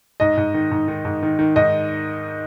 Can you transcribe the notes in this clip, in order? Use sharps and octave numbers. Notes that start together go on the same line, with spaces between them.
G#2 D#5
G#2
D#3
G#2
D#3
G#2
D#3
D#3
G#2 D#5